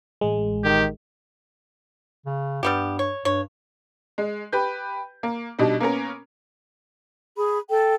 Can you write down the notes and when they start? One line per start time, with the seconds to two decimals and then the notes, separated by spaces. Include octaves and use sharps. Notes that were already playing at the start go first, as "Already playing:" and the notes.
0.21 A1 G#3
0.64 D#3 G4
2.26 C#3
2.63 G2 G3 B3 G4
2.99 C#5
3.25 G2 C#5
4.18 G#3
4.52 G4 B4 G6
5.23 A#3
5.59 B2 G3 D4 D#4
5.80 A#3 B3 C#4 A#4
7.35 G#4 B5
7.69 A4 G5